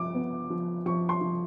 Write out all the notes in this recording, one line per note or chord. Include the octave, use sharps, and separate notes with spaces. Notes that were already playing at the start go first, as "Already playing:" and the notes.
Already playing: F3 D6
B3
F3
F3 C#6
C6
F3